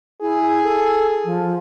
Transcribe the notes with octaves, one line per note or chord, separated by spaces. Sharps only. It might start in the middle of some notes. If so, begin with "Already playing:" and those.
E4 G#4
A4
F3